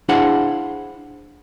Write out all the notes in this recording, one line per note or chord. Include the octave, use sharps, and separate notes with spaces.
D4 E4 G#4 C5 F5 F#5